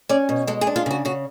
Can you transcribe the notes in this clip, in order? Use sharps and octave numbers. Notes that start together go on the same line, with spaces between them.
C#4 D5
B2
G#3 A4
G#4
D4
F4
C#3 F#4
C#3 F#4